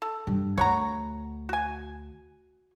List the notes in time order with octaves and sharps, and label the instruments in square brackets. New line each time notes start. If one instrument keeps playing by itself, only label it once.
[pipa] A4
[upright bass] G2 G3
[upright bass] D2 [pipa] C#5 F#5 A#5
[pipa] F#4 G#5